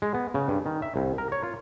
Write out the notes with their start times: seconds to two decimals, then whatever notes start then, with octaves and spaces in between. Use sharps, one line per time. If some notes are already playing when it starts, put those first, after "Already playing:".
0.02 G#3
0.14 B3
0.34 C#3
0.48 G2
0.66 D#3
0.82 E5
0.96 C2
1.18 A#4
1.32 C#5
1.43 F4